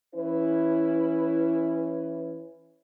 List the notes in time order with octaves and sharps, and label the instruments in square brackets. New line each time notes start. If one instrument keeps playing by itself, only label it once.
[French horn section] E3 C#4 E4 B4